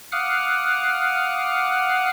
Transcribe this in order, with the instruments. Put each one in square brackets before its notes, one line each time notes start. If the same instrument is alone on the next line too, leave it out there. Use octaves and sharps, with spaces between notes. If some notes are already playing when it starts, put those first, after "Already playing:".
[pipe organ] F5 F#5 D6 D#6 F6 F#6